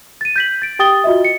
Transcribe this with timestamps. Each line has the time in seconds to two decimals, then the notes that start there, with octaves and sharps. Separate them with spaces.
0.21 A6 D#7
0.36 G6 B6 F#7
0.62 A6 D7
0.79 G4 G5 D#6 A6 G7
1.04 F4 F#4 D#5 E5
1.25 C#7